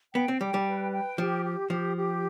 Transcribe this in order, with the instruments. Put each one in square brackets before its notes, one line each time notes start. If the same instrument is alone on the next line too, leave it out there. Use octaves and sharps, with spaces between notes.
[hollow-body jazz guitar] B3 [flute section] G5
[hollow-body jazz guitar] C4
[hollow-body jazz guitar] G3 [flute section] G5
[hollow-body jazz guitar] G3
[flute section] B4
G5
[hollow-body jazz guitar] F3 [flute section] G4
[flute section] G4
[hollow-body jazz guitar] F3 [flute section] G4
[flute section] G4